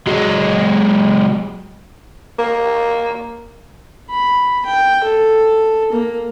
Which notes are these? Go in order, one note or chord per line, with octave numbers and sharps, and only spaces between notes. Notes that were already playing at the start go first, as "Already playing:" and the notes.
F#3 G#3
A#3
B5
G5
A4
A#3